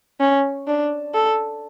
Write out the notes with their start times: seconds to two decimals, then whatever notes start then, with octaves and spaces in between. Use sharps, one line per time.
0.20 C#4
0.67 D4
1.14 A4